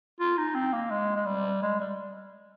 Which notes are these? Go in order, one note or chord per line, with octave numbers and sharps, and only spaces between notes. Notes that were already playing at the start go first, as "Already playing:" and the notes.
F4
D#4
C4
A#3
G#3
G#3
G3
G#3
G3